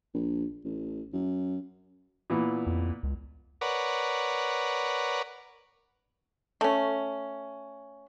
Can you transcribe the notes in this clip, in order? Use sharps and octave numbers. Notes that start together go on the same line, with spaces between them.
A#1
A1
F#2
A#2 E3 B3
F2
C#2
A#4 B4 C#5 D5 F#5
A3 C#4